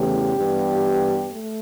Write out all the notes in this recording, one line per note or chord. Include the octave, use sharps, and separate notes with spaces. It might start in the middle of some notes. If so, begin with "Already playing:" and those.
Already playing: E2 C#3 E3 A3 G4
G2 E3 B3
A3